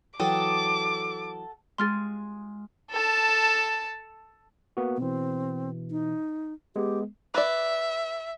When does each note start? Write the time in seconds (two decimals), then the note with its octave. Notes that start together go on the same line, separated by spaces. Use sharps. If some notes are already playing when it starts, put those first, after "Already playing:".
0.20 E3 F#3 F#4 A4 G5 D6 D#6
1.78 G#3 F4 G#4 C6 F6 A6
2.91 A4 A5
4.77 A#3 B3 F#4
4.98 B2 E3 C4
5.91 D#4
6.76 G#3 B3 G4
7.34 B4 D5 E5